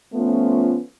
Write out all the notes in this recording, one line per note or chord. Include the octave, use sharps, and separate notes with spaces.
F3 A3 B3 C#4 F4